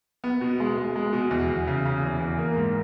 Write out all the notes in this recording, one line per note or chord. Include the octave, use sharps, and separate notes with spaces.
B3
B2
G#3
G#3
G#3
B2
E2
E2
C#3
C#3
E2
E2
A#3
G#2